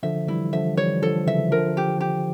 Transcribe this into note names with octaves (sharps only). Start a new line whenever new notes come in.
D3 F3 E5
E3 G3 E4
D3 F3 E5
E3 G3 C#5
D3 F3 A4
C#3 E3 E5
D3 F3 A#4
G4
G4